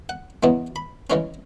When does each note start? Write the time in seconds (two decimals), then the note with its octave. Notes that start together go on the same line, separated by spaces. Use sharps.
0.09 F#5
0.43 E2 C#3 G#3 B3 E4
0.76 B5
1.10 C#3 E3 G#3 C#4